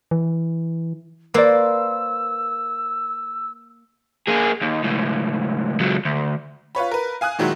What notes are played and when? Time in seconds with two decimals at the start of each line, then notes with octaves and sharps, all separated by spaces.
0.11 E3
1.34 A#3 B4 C5 D5 E6
4.28 A#3 G#4
4.62 D#2
4.84 C#2 A2
5.80 C#2 F#3
6.05 D2
6.75 F4 B4 C#5 B5
6.91 A#4 B4
7.21 F5 G#5 D#6 F#6
7.39 A#2 D#3 F#3 G#3 E4 F#4